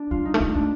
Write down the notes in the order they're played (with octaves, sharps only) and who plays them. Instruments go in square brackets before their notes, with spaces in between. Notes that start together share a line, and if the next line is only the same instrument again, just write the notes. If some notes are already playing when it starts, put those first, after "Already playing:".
Already playing: [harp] D4
[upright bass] G3 [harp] F4
[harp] D#4
[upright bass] A3
G#3
[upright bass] A3 [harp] D4